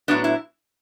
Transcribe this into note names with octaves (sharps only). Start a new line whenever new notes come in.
A2 F#3 B3 D4
E4